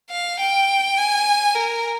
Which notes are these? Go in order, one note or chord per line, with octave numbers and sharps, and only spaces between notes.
F5
G5
G#5
A#4